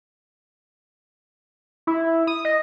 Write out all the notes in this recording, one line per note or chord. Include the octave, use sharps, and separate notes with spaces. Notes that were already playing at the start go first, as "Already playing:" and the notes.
E4
D#6
D#5